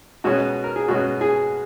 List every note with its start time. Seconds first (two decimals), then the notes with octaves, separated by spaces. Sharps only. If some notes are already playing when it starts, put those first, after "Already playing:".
0.24 B2 G#3 C#4 F#4
0.64 A#4
0.76 G#4
0.88 B2 G#3 C#4 F#4
1.21 G#4